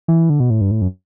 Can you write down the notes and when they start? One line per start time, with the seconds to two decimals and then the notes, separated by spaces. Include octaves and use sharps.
0.08 E3
0.30 D3
0.40 B2
0.50 A2
0.61 G2
0.71 A2
0.81 F#2